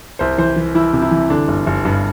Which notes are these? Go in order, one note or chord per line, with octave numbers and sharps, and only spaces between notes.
C2 C5
E3 C5
E3
E3 E4
C3
E4
E3
D3 D4
G1
G1
G2